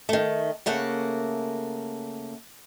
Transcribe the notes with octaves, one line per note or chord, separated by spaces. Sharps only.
D#3 A3
C#3 A3 A#3 F#5